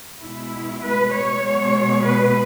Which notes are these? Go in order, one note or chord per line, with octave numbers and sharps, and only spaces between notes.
B2 G#3 E4
B4
C#5
B2 G#3
B4